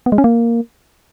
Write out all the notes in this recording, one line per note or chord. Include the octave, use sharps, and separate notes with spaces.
B3
G#3
C#4
A#3